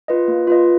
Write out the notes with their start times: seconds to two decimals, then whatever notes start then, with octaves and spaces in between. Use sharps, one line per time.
0.08 F4 B4 D#5
0.28 A#3
0.47 F4 B4 D#5